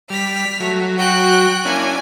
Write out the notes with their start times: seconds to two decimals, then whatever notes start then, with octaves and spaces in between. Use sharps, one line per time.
0.10 G3 F6 B6
0.60 F#3 A3
0.98 F#4 G5 F#6
1.65 A#3 C#4 D4 E4 G#5